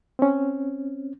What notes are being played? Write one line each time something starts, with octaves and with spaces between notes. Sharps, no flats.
C4 C#4